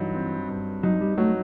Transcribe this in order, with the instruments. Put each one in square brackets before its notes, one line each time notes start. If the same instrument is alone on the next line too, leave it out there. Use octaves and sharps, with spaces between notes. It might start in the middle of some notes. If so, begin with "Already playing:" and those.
Already playing: [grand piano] G2 F#3 D#4 [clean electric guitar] E3
[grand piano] C4
G2
[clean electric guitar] F#3 [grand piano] D#4
[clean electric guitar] G3
[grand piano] F#3 [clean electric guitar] A3